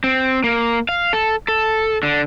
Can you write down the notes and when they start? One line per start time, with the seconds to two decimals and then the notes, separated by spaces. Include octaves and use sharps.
0.04 C4
0.44 A#3
0.89 F5
1.13 A4
1.48 A4
2.03 D3